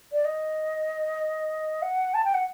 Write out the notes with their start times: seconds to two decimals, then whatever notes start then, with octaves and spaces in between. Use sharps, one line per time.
0.12 D5
0.25 D#5
1.82 F#5
2.14 A5
2.24 G5
2.34 F#5